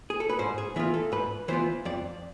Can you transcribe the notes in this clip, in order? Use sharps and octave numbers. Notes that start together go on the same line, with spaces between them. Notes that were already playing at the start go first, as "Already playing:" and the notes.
G#4
A4
B4
G#2 C5
G#4
E3 B3 F4 G#4
A4
G#2 B4
E3 B3 F4 C5
F2 D5